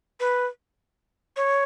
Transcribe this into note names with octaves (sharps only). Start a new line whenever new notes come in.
B4
C#5